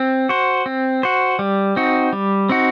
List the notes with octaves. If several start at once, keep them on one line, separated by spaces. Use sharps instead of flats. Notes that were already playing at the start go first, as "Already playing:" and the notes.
Already playing: C4
F#4 C5
C4
F#4 C5
G3
C4 D#4 F#4
G3
C4 D#4 F#4